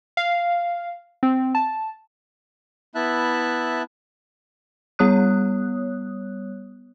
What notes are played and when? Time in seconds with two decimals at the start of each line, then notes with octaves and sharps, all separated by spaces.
0.17 F5
1.23 C4
1.55 A5
2.95 B3 E4 E5 A5 F#6
4.99 G3 B3 C#5 D#6 F#6